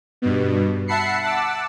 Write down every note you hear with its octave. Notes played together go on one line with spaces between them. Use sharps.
G2 B2
E5 F#5 A5 B5 C7 C#7
F#5 A5 D6 E6